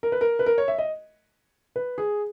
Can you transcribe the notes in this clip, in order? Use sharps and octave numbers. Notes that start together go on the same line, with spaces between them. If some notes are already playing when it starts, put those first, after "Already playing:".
A#4
B4
A#4
B4
A#4
C#5
E5
D#5
B4
G#4